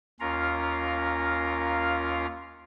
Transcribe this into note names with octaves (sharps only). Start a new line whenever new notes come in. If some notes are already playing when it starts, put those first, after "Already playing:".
D#2 C#4 F4 A#4 F5 A#5